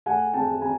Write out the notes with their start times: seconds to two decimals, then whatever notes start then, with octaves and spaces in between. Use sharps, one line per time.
0.06 A3 F#5 G#5
0.34 C4 G5 A5
0.61 C4 G#5 A#5